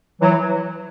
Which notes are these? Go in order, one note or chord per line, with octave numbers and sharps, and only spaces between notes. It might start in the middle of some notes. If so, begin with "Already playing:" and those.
E3 F#3